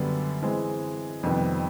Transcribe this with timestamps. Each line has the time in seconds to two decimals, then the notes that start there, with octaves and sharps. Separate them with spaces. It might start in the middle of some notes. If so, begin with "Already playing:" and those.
Already playing: F#2 D3 G3 B3
0.42 E3 G#3 C4
1.23 F2 C3 D#3 G3 B3